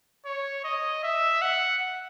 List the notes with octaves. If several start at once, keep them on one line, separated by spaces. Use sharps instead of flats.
C#5
D#5
E5
F#5